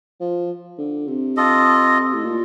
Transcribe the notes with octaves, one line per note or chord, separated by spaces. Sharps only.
F3
D3
C3
F4 A4 D#5
A2
A#2